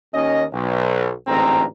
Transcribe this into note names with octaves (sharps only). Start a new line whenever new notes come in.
D#2 C#4 D#5
B1
A1 D2 G#2 C4 A#5